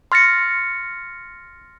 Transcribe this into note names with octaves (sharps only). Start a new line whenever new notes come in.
C6 F6 A6 A#6 C#7